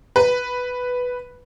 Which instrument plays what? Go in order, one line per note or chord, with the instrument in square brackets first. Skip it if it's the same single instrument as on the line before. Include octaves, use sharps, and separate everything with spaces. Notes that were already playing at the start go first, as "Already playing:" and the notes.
[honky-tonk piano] B4